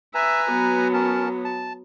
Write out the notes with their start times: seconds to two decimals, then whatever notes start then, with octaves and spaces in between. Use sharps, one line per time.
0.15 B4 E5 G#5 A#5
0.51 F#3 B3
0.94 C#4 A#4 A5
1.45 A5